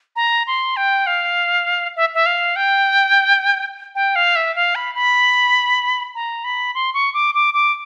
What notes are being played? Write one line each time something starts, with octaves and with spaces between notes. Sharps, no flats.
A#5
C6
G5
F5
E5
E5
F5
G5
G5
F5
E5
F5
B5
B5
A#5
B5
C6
C#6
D6
D6
D6